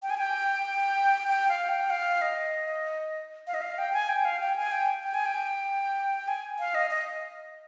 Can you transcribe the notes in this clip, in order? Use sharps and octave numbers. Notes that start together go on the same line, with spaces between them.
G5
G#5
G5
G5
F5
G5
F5
D#5
F5
D#5
F5
G5
G#5
G5
F5
G5
G#5
G5
G5
G#5
G5
G#5
F5
D#5
D#5